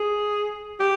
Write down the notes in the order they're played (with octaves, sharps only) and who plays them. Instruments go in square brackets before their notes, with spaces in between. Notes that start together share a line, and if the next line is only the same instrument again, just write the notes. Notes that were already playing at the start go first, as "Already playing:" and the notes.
Already playing: [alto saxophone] G#4
G4